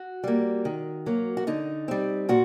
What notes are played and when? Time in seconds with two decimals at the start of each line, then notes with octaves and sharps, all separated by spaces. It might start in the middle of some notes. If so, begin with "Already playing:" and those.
Already playing: F#4
0.24 G3 A#3
0.65 D#3
1.06 F#3 A#3
1.37 F#4
1.47 D3 D#4
1.88 G3 C4
2.29 A#2 F#4